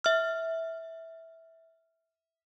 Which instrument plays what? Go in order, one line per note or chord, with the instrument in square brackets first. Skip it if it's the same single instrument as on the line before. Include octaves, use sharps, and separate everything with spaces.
[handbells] E5 F6